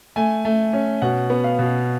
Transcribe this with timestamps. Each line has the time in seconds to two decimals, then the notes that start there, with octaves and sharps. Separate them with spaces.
0.16 A3 G#5
0.45 A3
0.73 C#4
1.02 B2 F#5
1.30 B3
1.44 F5
1.59 B2